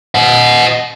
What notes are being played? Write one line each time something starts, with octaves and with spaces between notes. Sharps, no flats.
D#5 F#5